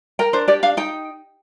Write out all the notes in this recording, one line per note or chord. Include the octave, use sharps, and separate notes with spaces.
A#4 G5
D4 C5
G4 D5
D4 F5
D#4 G5